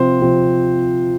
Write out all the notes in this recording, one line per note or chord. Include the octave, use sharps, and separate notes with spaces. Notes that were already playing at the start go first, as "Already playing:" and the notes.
Already playing: C3 F3 C4 C5
C3 F3 C4